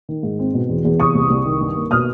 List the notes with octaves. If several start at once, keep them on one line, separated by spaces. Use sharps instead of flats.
D#3
G#2
C4
B2
E2
E2
C3 C#6 D#6
C2
C2
D#3
G2
A#3
B2 D#6 F6